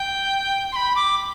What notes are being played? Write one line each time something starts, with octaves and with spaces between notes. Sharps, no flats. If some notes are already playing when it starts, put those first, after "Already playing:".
Already playing: G5
C6
B5
D6